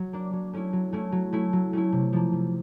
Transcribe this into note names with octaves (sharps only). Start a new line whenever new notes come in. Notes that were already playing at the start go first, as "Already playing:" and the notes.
Already playing: F#3
A#3 D4
F#3
A3 C#4 E4
F#3
A3 C#4 E4
F#3
A3 C#4 E4
F#3
A3 C#4 E4
C3
F3 A#3
C3